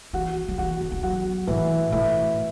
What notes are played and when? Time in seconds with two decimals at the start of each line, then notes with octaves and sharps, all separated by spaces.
0.13 E3 F#4
0.48 F#3
0.58 E3 F#4
0.81 D3
0.92 E3
1.02 F#3 F#4
1.47 A2 E3
1.92 A2 E4